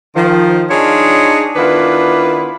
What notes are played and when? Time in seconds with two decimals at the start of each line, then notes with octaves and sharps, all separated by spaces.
0.16 D#3 F3
0.70 D4 D#4 F4 G#4 C#5
1.56 D#3 B3 D4 E4 F4 B4